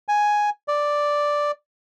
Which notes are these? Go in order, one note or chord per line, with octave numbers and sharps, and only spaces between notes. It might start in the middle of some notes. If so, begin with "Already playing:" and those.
G#5
D5